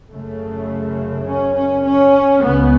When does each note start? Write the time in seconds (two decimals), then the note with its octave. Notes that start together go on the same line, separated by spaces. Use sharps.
0.11 F#2 C#3 A3
1.27 C#4
1.56 C#4
1.85 C#4
2.43 C#2 C#3 B3